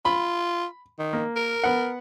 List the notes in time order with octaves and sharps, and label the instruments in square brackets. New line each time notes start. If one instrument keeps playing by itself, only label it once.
[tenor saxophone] F4 [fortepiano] B5
[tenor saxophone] D#3
[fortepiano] A#3
[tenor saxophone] A#4
[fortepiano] B3 F#5